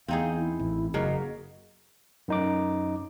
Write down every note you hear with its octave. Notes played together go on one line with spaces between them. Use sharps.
E2 C4 D#4 G#4 F5
E4
A1
F#1 C#3 F#3 A#3 D#5
F#2 D#4 D6